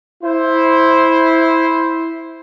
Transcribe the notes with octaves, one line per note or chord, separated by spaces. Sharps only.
E4 C5